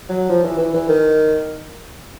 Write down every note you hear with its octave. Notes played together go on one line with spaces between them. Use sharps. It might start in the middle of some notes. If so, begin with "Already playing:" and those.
F#3
F3
E3
E3
E3
D#3